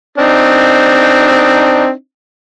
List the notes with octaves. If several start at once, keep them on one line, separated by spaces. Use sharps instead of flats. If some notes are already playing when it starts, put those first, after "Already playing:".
C4 D4 D#4